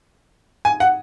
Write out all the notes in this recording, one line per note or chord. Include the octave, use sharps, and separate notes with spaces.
G#5
F#5